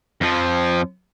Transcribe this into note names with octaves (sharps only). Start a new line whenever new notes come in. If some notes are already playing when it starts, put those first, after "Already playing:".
F2 F3